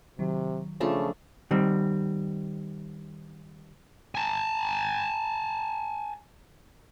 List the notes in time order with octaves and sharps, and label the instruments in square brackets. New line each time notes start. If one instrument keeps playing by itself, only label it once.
[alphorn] C3 [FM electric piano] D#3 F#3
[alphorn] C#3 [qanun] F3 A3 D4
[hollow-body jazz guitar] D#3 G3 C4
[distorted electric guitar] G#5 A5